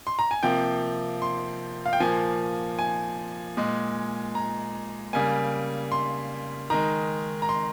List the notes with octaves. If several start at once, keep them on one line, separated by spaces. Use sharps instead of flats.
C6
A#5
G#5
C3 F3 A#3 G5
C6
F5
G5
A#2 F3 A#3 G#5
G#5
A#2 G#3
A#5
C#3 G3 A#3 G#5
C6
D#3 G#3 A#5
A#5
C6